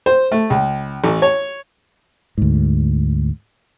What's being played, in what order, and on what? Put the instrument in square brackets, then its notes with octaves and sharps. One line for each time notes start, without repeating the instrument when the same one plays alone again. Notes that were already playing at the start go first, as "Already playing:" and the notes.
[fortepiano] C5
A3
C#2
A1
C#5
[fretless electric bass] D2 G#2